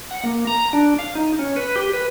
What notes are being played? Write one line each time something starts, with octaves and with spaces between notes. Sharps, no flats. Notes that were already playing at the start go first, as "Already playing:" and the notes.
F#5
A#3
A#5
D4
F5
D#4
C#4
B4
G4
B4